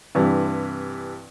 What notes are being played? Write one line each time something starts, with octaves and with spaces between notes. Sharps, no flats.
G2 C3 E3